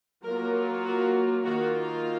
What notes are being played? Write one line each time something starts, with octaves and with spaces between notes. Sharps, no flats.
F#3 A#3 F4 A#4
F#4
D#3 A#3 F4 F#4